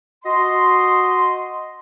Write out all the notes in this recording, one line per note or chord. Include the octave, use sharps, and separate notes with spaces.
F#4 D#5 C6